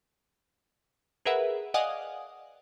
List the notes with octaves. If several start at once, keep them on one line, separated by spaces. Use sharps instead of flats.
G#4 A#4 B4 E5 F#5
D5 D#5 F5 F#5 G#5 D#6